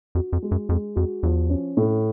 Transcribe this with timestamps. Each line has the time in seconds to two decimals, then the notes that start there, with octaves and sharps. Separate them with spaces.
0.15 F2 F#4
0.33 F2
0.42 G#3
0.51 F#2
0.69 F2 G#3
0.95 F2 F#4
1.23 E2 F3
1.50 C#4
1.77 A2